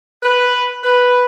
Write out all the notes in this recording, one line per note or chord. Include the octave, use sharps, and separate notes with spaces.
B4
B4